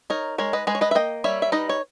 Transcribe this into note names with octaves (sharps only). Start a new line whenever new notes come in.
D#4 A#4 C#5
G#3 A#4 C#5
B4 D#5
G#3 G#4 B4
C#5
B4 D#5
E5
A#3 D#5 G5
G3 C#5 E5
E5
D#4 B4 D#5
C#5